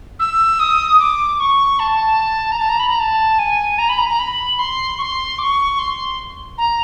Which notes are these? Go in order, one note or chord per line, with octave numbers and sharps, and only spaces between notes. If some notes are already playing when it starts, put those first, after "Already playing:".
E6
D#6
D6
C#6
A5
A#5
A5
A#5
B5
A#5
A5
G#5
A#5
B5
A#5
A#5
B5
C6
C#6
C6
D6
C#6
C6
A#5